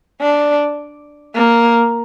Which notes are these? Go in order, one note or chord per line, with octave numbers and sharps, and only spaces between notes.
D4
A#3